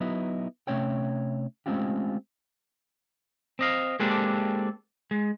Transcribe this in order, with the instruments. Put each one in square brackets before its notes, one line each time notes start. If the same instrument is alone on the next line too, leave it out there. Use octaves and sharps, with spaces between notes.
[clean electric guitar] F#3 B3 D#4 E4
C3 A3 C#4 C#5 G5
G#3 A3 C4 C#4 F4 G4
C4 D#5 F5
G#3 A#3 C4 D4 G4 A4
G#3